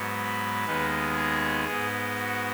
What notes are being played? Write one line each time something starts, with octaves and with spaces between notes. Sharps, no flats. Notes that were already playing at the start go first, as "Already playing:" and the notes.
Already playing: G#2 F#3 B3
B4
D#2 D#3 G#3 B3
G#4
G#2 G#3 B3
F#4